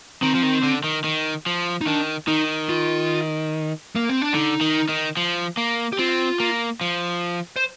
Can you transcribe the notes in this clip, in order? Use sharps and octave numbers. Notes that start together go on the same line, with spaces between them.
D#3 C4
F3
D#3
D3
D#3
D#3
F3
D#4
D#3 D4
D#3 D#4
F4
A#3
C4
D4
D3 D#4
D#3
D#3
F3
A#3
G4
C4 F4
A#3
F3
C5